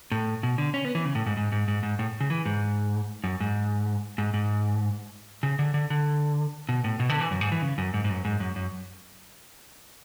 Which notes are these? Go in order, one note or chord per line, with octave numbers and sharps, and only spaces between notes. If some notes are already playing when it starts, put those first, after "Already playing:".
A2
B2
D3
C#4
B3
E3
C#3
A2
G#2
G#2
G#2
G#2
G#2
A2
C#3
E3
G#2
F#2
G#2
G#2
G#2
C#3
D3
D3
D3
B2
A2
B2
D3
E3
F#2
G#2
E3
C#3
F#2
G#2
G#2
F#2
G#2
F#2
F#2